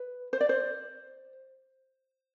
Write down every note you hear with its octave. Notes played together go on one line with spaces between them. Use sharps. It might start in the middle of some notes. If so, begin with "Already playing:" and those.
Already playing: B4
C5
D5
C5